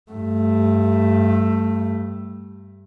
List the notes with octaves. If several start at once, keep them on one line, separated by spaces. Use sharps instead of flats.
G2 A3